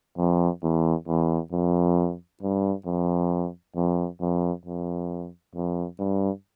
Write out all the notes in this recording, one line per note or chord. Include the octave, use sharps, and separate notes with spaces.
F2
E2
E2
F2
G2
F2
F2
F2
F2
F2
G2